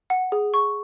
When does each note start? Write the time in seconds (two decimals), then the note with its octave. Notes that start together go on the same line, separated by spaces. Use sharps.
0.10 F#5
0.32 G#4
0.54 C#6